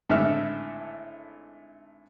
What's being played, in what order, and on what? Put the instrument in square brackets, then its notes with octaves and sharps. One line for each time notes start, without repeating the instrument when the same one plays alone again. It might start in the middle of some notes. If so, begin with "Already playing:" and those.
[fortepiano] G#1 A2 D3 A4 E5 F6